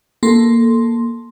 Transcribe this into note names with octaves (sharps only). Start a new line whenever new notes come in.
A#3 A4 C6